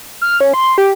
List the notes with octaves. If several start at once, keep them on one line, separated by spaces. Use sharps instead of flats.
F6
C#4
C6
G4